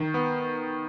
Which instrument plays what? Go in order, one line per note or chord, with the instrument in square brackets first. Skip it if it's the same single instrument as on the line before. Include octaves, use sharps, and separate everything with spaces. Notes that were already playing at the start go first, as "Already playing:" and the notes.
Already playing: [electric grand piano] D#3
B3